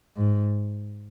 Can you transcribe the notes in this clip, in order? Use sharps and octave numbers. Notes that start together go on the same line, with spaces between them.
G#2